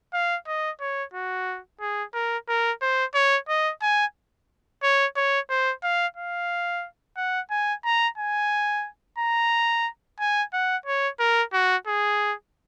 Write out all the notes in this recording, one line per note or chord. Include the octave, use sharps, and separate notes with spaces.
F5
D#5
C#5
F#4
G#4
A#4
A#4
C5
C#5
D#5
G#5
C#5
C#5
C5
F5
F5
F#5
G#5
A#5
G#5
A#5
G#5
F#5
C#5
A#4
F#4
G#4